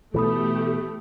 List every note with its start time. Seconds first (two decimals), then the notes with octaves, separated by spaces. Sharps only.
0.14 B2 E3 A3 G4 A4 B5 D#6